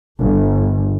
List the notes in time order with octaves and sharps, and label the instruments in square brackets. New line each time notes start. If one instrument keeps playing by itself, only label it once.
[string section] G1